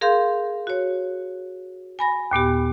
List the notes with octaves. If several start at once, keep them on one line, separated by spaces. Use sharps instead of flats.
G#4 A#4 F5 C6 G6
F#4 C#5
G#5 B5 A#6
D#2 A#2 B3 G4